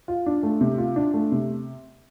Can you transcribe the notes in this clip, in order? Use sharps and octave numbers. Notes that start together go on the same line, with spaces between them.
F4
D4
A3
C3
F4
D4
A3
C3